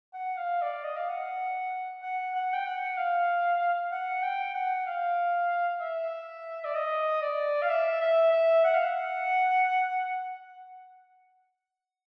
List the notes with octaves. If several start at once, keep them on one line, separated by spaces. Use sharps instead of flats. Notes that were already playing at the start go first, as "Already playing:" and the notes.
F#5
F5
D5
D#5
F5
F#5
F#5
F#5
G5
F#5
F5
F#5
G5
F#5
F5
E5
D5
D#5
D5
F5
E5
E5
E5
F#5
F5
F#5